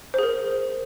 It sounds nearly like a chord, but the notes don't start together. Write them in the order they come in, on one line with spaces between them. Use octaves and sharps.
C5 G#4 A#4